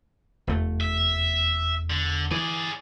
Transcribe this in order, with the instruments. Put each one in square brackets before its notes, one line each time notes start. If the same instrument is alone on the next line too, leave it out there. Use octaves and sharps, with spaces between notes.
[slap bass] F1 A3 [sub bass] E2
[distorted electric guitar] E5
D3
[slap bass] E3 [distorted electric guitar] G#4 D5